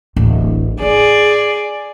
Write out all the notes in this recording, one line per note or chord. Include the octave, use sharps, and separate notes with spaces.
D1 A1
F4 G#4 D5